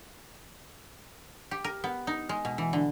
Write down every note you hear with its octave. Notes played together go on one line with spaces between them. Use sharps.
G4
A#4
B3
D#4
G#3
B2
E3
D3